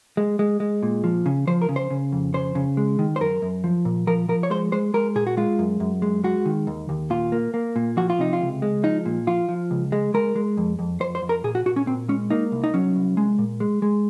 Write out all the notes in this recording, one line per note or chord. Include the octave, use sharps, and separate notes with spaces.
G#3
G#3
G#3
A#2
F3
C#3
F3 C5
A#4
C#3
C5
C#3
F2
C#3 C5
C#3
G#3
D#3
C5
F#2 A#4
F#2
F3
A#2
F3 A#4
F3 A#4
C#5
G#3 C5
G#3 C5
G#3 A#4
A#2 G#4
F#4
G#3 F4
F#2
F#2
G#3
G#3 F#4
D#3
D#2
D#2
A#2 F4
A#3
A#3
A#2
F3 F#4
F4
C3 D#4
F4
C#2
G#3
F3 D#4
A#2
F3 F4
F3
C#2
G#3
G#3 A#4
G#3
F2
F2
F2 C5
C5
F2
A#4
A#2 G#4
F#4
A#2 F#4
C#4
A#2 C4
G#3 C#4
A#3 D#4
C2
D#4
F#3 C#4
C2
G#3
A#2
G#3
G#3